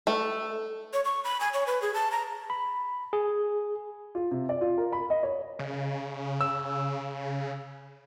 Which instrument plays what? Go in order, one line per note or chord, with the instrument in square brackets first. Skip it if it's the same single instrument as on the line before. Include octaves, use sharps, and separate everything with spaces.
[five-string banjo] A3
[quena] C#5
C#6
B5
G#5
C#5
B4
G#4
A5
A#5
[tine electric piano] B5
G#4
[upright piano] F4
C3
D5
F4
A#4
B5
D#5
C#5
[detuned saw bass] C#3
[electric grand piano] E6